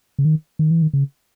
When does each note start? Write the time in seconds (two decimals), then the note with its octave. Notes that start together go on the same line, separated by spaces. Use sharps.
0.19 C#3
0.25 D#3
0.59 D#3
0.71 E3
0.82 D#3
0.93 C#3